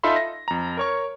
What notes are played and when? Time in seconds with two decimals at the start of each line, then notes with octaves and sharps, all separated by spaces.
0.03 D#4 F4 A4 E5 B5 C6
0.16 A#6
0.48 F2 A#5
0.77 A#4 C#5 C#6